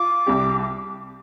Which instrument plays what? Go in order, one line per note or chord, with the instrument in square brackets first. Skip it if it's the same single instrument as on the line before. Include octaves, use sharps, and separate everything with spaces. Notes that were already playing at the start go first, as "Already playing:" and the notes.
Already playing: [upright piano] F4 [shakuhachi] D6
[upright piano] C2 C3 G3 C4 G4